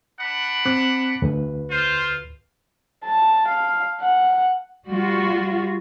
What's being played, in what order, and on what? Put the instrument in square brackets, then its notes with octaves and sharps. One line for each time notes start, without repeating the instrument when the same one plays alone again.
[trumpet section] D4 F#5 B5
[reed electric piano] C4 D6 F#6
D2 B4
[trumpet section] F4 C5
[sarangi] A5
F5
F#5
[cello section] G3 F4 F#4